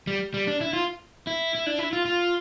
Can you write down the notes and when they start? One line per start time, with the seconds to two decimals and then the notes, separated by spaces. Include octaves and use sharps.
0.07 G3
0.34 G3
0.47 D4
0.61 E4
0.73 F4
1.27 E4
1.55 E4
1.67 D4
1.78 E4
1.93 F4
2.05 F4